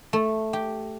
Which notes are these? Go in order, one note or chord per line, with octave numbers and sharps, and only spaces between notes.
A3
G4